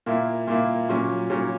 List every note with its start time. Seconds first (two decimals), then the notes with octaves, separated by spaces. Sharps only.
0.06 A#2 A#3 E4
0.47 A#2 A#3 E4
0.89 A#2 F#3 C#4
1.30 A#2 F#3 C#4